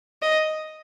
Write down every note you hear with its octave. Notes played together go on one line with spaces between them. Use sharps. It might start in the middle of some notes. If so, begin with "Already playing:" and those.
D#5